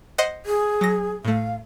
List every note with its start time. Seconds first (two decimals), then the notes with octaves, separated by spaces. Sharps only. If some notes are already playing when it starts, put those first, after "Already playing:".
0.18 C5 D#5 F#5
0.46 G#4
0.81 F#3 A#6
1.25 A2 A3 F5